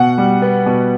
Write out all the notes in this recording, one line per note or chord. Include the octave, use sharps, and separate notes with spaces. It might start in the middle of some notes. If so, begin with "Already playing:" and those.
Already playing: B2 F#5
G3
B3
B2